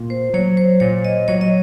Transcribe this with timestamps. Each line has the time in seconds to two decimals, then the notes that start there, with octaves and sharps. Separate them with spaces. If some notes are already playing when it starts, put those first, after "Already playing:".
Already playing: A#2
0.10 C5
0.34 F#3 C#5
0.57 C5
0.80 A#2 C#5
1.05 D#5
1.28 F#3 C#5
1.41 D#5